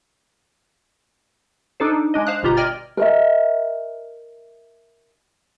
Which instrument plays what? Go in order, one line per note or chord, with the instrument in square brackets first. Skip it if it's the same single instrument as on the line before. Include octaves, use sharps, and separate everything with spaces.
[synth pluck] D4 D#4 A4 C5
G#3 D4 D#5
C5 F5 D#6 F#6
G1 B2 F4 G4 A#5
D5 D#5 G5 F6 G#6 A6
[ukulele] A#4 D#5 E5